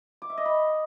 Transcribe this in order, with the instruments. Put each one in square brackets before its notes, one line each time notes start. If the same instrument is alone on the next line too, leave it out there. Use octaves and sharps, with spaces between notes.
[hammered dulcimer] D6
E5
D#5
B5